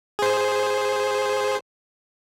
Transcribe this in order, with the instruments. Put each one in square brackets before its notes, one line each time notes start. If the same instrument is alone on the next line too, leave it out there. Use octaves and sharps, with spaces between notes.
[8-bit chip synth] G#4 C5